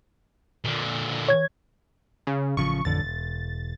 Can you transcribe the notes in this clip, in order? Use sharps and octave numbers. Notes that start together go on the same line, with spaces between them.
A#2 D3
C#5 G#6
C#3
A1 C#3 F3 C#6
A1 F2 D3 A6
E1